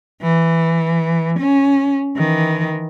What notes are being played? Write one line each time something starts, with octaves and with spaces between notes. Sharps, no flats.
E3
C#4
D#3 E3